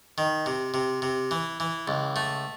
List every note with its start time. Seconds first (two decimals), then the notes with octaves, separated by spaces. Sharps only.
0.18 D#3
0.46 C3
0.74 C3
1.02 C3
1.31 E3
1.60 E3
1.88 C#2
2.16 A3